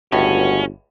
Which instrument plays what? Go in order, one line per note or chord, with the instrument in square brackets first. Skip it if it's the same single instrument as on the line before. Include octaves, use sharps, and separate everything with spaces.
[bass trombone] G1 [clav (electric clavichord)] C#2 A2 [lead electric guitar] C#4 [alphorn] F#4